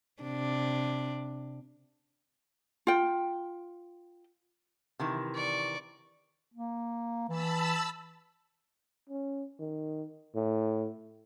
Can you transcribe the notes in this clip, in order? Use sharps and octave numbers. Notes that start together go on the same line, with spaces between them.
C3 D4
F4 G5
C3 D#3 E3
D5 C#6
A#3
E3 A5 B5 E6
C#4
D#3
A2